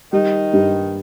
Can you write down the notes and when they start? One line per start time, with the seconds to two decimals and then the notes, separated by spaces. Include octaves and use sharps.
0.13 D#3 G3 D#4
0.53 G2